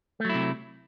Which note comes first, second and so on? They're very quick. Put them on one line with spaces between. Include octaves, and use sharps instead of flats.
A3 F#3 E4 C3